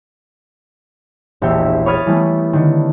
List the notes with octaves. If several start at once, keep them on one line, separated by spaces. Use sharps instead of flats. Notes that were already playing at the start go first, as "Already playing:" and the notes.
E1 A#1 G4 E5 C#7
C#5 B5 D#6 F6 G#6 A6
E3 G3 A3 B3
D3 D#3